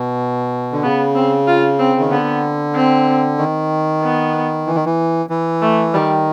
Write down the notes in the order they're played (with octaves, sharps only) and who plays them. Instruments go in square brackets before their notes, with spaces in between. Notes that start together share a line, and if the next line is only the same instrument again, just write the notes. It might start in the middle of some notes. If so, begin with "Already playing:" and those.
Already playing: [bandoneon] B2
D3
[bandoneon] C#3 [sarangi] B3
[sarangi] C4
F4
C4
[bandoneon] D#3
[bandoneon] D3 [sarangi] B3
[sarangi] C4
[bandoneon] D#3
[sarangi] B3
[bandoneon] E3
D#3
E3
E3
[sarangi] A3
[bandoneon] D#3 [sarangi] G3